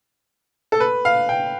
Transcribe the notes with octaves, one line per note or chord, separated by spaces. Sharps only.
A4
B4
F5
G5